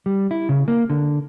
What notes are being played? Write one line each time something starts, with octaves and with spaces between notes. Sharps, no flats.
G3
E4
C#3
A#3
D3